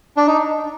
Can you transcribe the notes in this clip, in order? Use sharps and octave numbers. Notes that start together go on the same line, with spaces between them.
D4
D#4